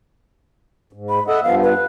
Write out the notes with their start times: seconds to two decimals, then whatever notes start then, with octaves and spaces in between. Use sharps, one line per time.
0.93 G#2
1.09 B5
1.27 A4 D#5 E5 F#5
1.43 G2 F3 B3 F5
1.63 B4